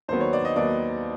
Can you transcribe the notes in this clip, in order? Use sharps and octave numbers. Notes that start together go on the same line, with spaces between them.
D#2 D#3 F#3 B3 C5
C#5
D5
D#5
D#2 D#3 F#3 B3 D5